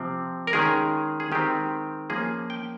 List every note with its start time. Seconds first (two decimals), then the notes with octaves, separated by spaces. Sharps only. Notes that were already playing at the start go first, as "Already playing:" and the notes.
Already playing: C3 F3 C4
0.47 A#4
0.53 D#3 G#3 C#4 G#4
1.20 G#4
1.32 D#3 G#3 C4 G4
2.10 F3 A#3 C#4 G#4
2.50 G5